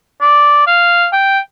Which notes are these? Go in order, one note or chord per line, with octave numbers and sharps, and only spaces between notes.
D5
F5
G5